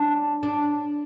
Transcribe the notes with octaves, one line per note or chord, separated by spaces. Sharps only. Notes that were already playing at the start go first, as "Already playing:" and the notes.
Already playing: D4
D4